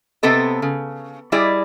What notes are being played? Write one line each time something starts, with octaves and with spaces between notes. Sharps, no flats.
C3 B3 C4 A4 D#5
C#3
G3 E4 G#4 D5 D#5